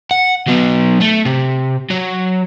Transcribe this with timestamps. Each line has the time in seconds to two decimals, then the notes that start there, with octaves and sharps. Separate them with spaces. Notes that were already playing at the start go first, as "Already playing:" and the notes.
0.11 F#5
0.47 F#3 B3
1.01 A3
1.26 C3
1.90 F#3